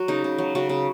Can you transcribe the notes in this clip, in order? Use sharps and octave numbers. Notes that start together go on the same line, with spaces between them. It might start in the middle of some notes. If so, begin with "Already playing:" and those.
Already playing: F#3 F#4
C#3 D#4
C#3
F#3
C#3 F#4
C#3